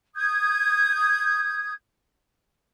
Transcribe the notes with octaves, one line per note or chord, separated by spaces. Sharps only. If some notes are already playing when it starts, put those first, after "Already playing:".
D#6 G6 G#6